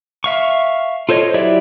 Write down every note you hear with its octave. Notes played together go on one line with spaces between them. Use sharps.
E5 F5 C#6
F4 A4 C5 C#5 D#5
F#3 E4 G4 D5 E5